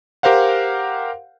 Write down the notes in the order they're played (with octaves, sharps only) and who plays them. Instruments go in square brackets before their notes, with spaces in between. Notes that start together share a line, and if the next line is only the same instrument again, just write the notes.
[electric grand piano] G4 A#4 C5 F5 F#5